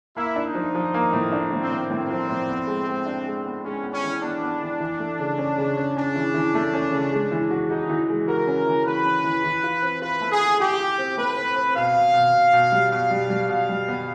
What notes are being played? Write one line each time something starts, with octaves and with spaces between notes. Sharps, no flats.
A#3 E4
D4
D#4
F3
F3
A#3
A2
D4
A2
C4
A2
A2 C4
F3
A2
B3
G#3
G#3
D4
G#3
B3
G#3 C#4
B3
C#4
E3
B3 D4
B3
E3
E3
A3
C#3
C#4
C#3
C#4
C#4 D4
E3
E3
A3
C#4
C#3
G#3
E3
F#4
D#4 F#4
E3
G#3
F#4 A#4
C#4
E3
E3 B4
C#4
E3
E3
F4
C4
F4 B4
A3
G#4
F4
F4 G4
F4
C4
A3 B4
C4
C4
B2 F5
B2
B2
B2
B2
G3
B2 F5
G3
G3
B2 F5
G3
B3